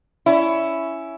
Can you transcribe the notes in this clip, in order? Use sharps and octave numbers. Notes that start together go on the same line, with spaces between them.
C#4 E4